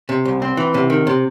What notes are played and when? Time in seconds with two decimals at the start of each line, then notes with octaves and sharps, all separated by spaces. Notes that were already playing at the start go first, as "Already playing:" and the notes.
0.09 C3
0.25 C2
0.42 C4
0.57 E3
0.74 C3
0.90 D#3
1.07 C3